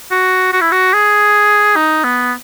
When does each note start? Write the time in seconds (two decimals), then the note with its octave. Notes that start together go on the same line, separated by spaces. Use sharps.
0.11 F#4
0.53 F#4
0.61 E4
0.72 F#4
0.94 G#4
1.76 D#4
2.04 B3